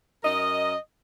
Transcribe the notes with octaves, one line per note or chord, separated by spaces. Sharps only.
F#2 A#4 D#5